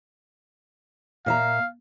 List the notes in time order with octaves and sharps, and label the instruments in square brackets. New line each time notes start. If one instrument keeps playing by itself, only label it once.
[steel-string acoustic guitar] A#2 E5 A#5 [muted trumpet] F5